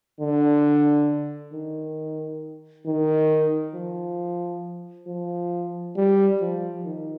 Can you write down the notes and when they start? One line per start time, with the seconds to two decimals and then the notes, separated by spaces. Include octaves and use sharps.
0.21 D3
1.54 D#3
2.87 D#3
3.75 F3
5.08 F3
5.97 G3
6.41 F3
6.85 D#3